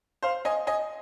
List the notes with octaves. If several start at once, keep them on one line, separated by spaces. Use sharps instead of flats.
C5 F5
D#5 G#5
D#5 G#5